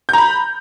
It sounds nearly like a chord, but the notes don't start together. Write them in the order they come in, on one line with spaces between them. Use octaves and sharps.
G6 A#5 B5